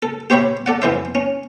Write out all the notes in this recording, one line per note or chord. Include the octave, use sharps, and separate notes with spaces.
A4
G4 C5 C#5 E5 B5
A4 D5 F#5
F2 E3 C5 E5
C#4